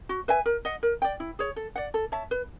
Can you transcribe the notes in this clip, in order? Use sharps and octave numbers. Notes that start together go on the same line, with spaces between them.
F#4
B4 E5 G#5
A#4
D#5 F#5
A#4
D5 G5
E4
G#4 C#5
A4
D5 F#5
A4
C#5 E5 A5
B4